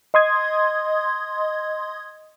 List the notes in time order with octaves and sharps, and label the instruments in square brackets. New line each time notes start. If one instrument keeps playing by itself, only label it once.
[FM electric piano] D#5 C6 D#6 G#6